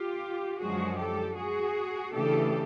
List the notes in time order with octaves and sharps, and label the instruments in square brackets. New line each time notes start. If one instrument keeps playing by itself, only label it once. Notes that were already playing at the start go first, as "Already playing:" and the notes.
Already playing: [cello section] F4 G4
F#2 D3 F3 G#3 F#4 G#4
G4 A4
F#4 G#4
C#3 E3 A3 D4 G4 A4